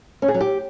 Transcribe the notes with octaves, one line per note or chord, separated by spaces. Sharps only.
C#4
G#4
F#3
G4